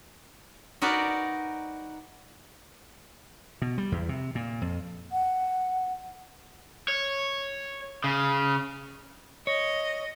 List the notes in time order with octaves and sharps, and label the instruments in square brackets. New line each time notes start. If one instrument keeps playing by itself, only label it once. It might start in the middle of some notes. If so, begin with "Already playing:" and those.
[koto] D#4 F#4 A#4 B4 D5
[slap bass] B2
G3
E2
C3
A#2
F2
[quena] F#5
[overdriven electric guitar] C#5
C#3
[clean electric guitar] C#5 [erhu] D#5